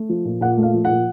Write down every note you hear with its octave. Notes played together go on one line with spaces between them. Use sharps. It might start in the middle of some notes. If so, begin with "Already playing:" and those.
Already playing: A3
F3
A#2
A#2 F#5
A3
F5
F3
A#2 F#5